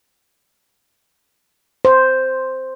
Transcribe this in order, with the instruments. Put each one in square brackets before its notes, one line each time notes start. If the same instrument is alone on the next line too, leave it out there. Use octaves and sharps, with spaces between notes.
[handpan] C5